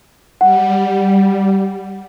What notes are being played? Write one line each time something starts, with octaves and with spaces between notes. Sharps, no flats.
G3 F#5